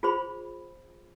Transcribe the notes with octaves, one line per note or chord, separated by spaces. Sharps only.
F4 G#4 C5 B5